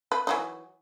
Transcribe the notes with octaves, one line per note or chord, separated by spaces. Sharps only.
B4
E3 F#3 D#4